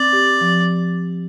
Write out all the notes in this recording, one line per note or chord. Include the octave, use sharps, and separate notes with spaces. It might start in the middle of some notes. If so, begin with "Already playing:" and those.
Already playing: C4 D5
G4
F3